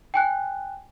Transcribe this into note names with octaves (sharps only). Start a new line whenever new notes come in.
G5 G#5 F#6